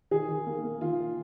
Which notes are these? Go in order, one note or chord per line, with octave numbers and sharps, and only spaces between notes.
D#3 G#4
D#3
A#3
A#3
D#3 F4
D#3